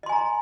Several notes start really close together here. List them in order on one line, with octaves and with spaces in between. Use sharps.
D#5 C6 G#5 A#5